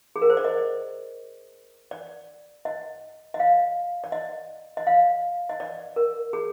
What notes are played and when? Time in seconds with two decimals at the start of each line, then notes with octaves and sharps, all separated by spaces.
0.16 G#4
0.22 A#4
0.30 C5
0.37 D5
0.44 D#5
1.91 D5
2.65 D#5
3.34 D#5
3.40 F5
4.04 D5
4.12 D#5
4.77 D#5
4.87 F5
5.49 D#5
5.60 D5
5.96 A#4
6.33 G#4